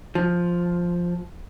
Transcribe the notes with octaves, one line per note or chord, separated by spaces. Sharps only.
F3